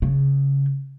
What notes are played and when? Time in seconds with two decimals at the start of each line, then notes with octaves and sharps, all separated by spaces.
0.02 C#3